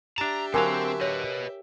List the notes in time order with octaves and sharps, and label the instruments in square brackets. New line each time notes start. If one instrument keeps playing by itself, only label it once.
[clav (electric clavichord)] D4 A5 [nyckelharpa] G4 E5 [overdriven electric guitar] A#5
[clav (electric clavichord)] D3 F#3 F5 [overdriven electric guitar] C4 C5 [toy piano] A#4 G#5
[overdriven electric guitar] B4 D#5 [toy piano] C#5